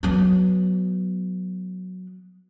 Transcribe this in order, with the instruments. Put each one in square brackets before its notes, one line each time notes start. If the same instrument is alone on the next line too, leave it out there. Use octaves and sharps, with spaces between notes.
[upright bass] F#3 B3